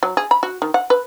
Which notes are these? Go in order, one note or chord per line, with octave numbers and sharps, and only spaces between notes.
F#3
G#4
B5
F#4
D#3
F#5
B4